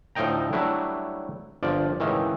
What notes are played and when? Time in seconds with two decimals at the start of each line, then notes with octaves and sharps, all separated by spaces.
0.15 D2 A2 F3 D#4 G5 A#5
0.53 F#3 G3 A3 D4 E4
1.63 G1 F3 D5
2.00 C#2 A2 D#3 E3